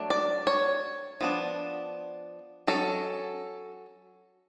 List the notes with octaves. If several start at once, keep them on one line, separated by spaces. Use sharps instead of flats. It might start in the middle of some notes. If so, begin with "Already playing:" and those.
Already playing: F#3 A3 D4
D5
C#5
F3 B3 D4
F#3 C#4 A4